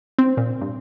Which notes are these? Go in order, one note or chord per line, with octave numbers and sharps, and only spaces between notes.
C4
A#2
G2